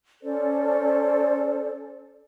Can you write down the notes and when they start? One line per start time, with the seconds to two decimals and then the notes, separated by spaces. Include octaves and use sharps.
0.22 C#4 A4 C5 D5